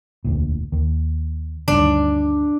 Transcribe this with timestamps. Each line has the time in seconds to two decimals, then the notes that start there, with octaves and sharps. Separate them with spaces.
0.25 E1 D2 A#2
0.72 D#2
1.68 D2 G2 D#3 D4